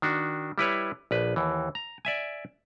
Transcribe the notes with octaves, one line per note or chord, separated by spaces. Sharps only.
D#3 D4 F#4
G3 E4 B4 C#5
A#1 B4
D#2 E3
A#5
D5 E5 G#5